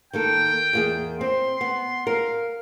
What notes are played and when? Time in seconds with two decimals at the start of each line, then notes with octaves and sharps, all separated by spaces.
0.13 D#3 A#3 A4 G5
0.73 E2 A#3 G#4
1.21 C4 C6
1.61 B3
2.07 A#4 F5